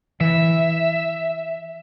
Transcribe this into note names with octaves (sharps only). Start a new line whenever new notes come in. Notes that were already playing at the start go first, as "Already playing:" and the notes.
E3 E5